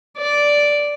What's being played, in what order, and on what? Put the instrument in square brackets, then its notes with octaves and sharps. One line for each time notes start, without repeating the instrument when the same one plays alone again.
[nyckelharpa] D5